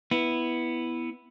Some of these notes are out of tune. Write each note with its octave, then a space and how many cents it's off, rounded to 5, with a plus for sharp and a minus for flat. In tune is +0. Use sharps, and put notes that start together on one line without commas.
B3 +0 E4 +0